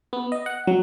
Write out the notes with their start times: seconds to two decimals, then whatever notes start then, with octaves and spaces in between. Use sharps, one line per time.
0.13 B3
0.32 D#5
0.46 F#5
0.67 F#3